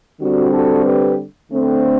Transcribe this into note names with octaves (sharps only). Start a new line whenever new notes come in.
D3 G3 C4 F#4
F#4 A4
G4 B4
D3 A3 C4